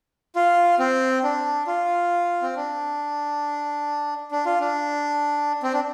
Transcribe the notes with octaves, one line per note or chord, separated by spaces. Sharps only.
F4
C4
D4
F4
C4
D4
D4
F4
D4
C4
D4